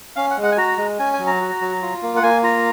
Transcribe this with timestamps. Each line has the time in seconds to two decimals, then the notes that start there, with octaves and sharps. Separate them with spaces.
0.16 C#4 F5
0.31 F#5
0.37 G#3
0.43 F#5
0.52 G#5
0.57 F#4 A#5
0.78 G#3
0.99 C#4 G#5
1.13 G#5
1.19 F#3
1.27 A#5
1.41 F#4
1.61 F#3
1.82 F4
2.02 A#3
2.16 F#5
2.23 A#3 G#5
2.43 F4 A#5